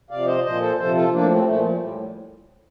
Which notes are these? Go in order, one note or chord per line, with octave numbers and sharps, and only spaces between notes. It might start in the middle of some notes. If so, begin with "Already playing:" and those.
C3 F3 D5 F5
C5 D#5
A#2 F3 C5 D#5
A4 C5
C3 F3 A4 C5
F4 A4
A2 F3 A#3 D4
A3 C4
G3
A#2 F3 A3
F3
A2 F3 G3